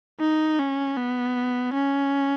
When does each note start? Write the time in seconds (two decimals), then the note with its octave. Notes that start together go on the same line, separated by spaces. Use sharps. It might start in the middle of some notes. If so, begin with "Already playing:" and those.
0.21 D#4
0.59 C#4
0.97 B3
1.74 C#4